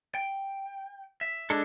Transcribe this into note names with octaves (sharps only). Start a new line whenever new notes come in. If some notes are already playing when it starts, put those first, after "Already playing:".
G5
E5
G#3 D4 A4